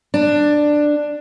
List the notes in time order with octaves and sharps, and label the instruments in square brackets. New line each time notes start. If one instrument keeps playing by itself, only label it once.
[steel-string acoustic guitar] D4